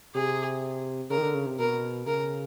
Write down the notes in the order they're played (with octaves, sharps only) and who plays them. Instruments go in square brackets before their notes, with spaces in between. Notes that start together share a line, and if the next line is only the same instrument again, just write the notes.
[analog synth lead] C3 [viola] G#4
[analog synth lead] C#3 [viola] A#4
[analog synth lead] D#3
D3
C#3
C3
[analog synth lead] B2 [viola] A#4
[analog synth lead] C#3 [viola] A#4